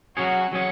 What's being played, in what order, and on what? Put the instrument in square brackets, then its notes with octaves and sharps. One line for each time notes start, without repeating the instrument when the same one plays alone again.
[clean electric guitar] F#3 C#4 G#4 C#5 [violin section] F#4
[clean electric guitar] F#3 C#4 G#4 C#5